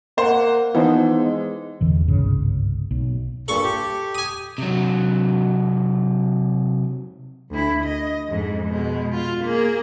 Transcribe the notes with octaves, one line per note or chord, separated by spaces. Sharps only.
A#3 C5 F#5
E3 F3 B3 D#4 C5
G#3
A1 E2 D3 E3
G1 C2 G#2 C#3
B1
G2 A#2 A4 C#6
G4
G#5 D#6
C3 F#3
D2 E4
D#5
F2 G#2
B2 G#3
F4
A#3 G#4